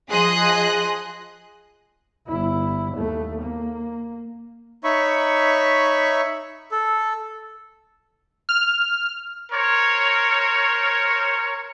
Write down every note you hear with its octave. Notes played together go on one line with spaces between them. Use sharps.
F3 G#4 D#5 C6 D#6 F#6
G1 E4
D#2 A3
A#3
D#4 C#5 E5 B5 C#6
A4
F6
A#4 C5 C#5